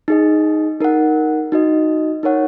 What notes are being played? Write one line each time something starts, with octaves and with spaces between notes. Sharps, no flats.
D#4 G#4 D#5
D#4 A#4 F#5
D#4 F#4 D#5
D#4 A#4 C#5 F#5